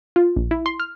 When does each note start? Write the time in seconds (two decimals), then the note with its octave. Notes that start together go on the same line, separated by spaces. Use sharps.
0.16 F4
0.36 A#1
0.51 E4
0.66 C6
0.80 F6